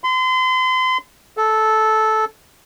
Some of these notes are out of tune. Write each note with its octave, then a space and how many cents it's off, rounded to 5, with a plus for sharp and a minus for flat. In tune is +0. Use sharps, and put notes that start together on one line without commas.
C6 -35
A4 -10